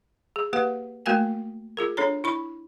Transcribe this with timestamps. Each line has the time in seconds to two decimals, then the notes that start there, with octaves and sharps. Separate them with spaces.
0.36 G#4
0.53 A#3 G4 B4 F#5
1.06 A3 A#3 F#4 A#4 G5 G#5
1.77 F4 G#4 A#4
1.97 D4 A4 C#5 A#5
2.24 E4 B5 C#6